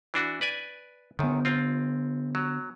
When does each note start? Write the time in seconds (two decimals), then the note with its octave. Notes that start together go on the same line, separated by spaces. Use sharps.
0.14 E3 D4 F#4
0.41 B4 D5 G#5
1.19 F#2 D3 D#3 B3
1.45 C4 F4
2.35 F#3